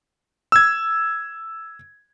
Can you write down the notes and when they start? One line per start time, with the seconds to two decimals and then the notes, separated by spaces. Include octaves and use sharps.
0.52 E6 G#6